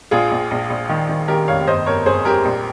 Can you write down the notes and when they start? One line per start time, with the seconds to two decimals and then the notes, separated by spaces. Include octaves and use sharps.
0.11 A#1 F4 G#4
0.31 A#1
0.51 A#1
0.70 A#1
0.89 D#3
1.09 D#3
1.28 D#3 G4 A#4
1.48 F1 C#5 F5
1.67 G1 C5 D#5
1.86 G1 A#4 C#5
2.06 G1 G#4 C5
2.25 G2 G4 A#4
2.45 A#1